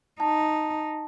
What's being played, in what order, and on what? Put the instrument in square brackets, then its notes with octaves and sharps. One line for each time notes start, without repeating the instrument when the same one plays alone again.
[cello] D#4 [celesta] A5